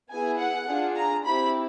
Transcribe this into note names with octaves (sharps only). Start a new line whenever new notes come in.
B3 E4 G#4 G#5
F#5
D4 F4 G#4
A#5
C4 E4 G4 B5